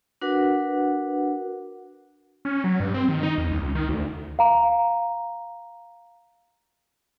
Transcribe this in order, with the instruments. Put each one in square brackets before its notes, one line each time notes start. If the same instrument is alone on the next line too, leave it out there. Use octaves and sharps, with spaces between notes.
[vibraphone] D4 F#4 A#4 B4 F#5
[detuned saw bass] C#4
F#3
G2
C4
D#3
D#4
E2
C#2
D#3
D2
[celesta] F5 A#5